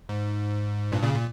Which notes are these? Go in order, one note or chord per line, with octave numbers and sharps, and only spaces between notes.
G#2
G2 A#2
A#2 C#3
A#2